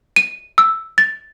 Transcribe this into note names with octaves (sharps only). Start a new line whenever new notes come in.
D#7
E6
A6